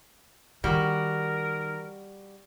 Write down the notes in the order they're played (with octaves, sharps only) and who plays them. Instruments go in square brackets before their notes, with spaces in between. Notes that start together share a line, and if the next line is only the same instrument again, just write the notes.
[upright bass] D#3 [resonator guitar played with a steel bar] G3 F#4 [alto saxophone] A#4